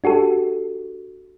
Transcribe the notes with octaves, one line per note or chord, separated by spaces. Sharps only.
D4 F#4 G4 A4